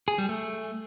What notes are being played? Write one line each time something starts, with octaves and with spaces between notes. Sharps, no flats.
G#4
G3
A3